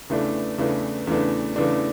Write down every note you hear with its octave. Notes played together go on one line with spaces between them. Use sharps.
E2 C#3 E3 A3 D4
E2 C#3 E3 A3 D4
E2 C#3 E3 A3 D4
E2 C#3 E3 A3 D4